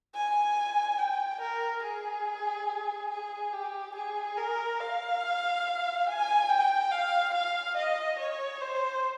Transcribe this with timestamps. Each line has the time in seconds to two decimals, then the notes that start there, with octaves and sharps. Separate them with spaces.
0.15 G#5
0.98 G5
1.41 A#4
1.83 G#4
3.10 G#4
3.53 G4
3.95 G#4
4.37 A#4
4.80 F5
6.07 G#5
6.49 G5
6.92 F5
7.34 F5
7.76 D#5
8.19 C#5
8.61 C5